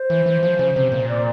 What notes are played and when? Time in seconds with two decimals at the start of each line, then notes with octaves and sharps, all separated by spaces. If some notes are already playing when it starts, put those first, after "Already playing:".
Already playing: C5
0.10 E3
0.26 E3
0.43 F3
0.59 C#3
0.76 C3
0.92 A#2
1.08 D5